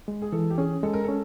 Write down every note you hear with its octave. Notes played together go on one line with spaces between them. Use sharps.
G#3
G#4
E3 A4
G4
C#4 G#4
G#3 A4
A#4
C#4 A4